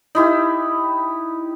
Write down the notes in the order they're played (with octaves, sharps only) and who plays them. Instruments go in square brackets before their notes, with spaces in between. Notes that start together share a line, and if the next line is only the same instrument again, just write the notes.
[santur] D#4 E4 G4